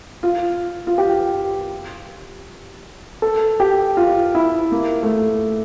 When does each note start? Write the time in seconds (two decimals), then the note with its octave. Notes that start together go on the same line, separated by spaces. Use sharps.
0.23 F4
0.87 F4
0.98 G4
3.22 A4
3.60 G4
3.97 F4
4.35 E4
4.72 A#3
5.03 A3